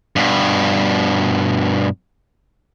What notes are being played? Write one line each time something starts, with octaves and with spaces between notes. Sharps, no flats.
G2 B2